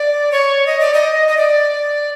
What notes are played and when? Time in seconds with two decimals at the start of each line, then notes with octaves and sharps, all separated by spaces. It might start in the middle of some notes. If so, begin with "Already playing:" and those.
Already playing: D5
0.32 C#5
0.66 D#5
0.80 D5
0.94 D#5
1.28 D#5
1.37 D5